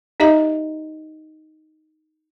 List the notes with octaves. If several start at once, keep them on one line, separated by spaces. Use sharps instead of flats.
D#4 G4 D#5 E5 A#5